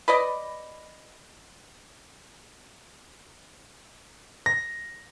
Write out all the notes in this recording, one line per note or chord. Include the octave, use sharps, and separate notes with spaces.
B4 D5 D#5
A#6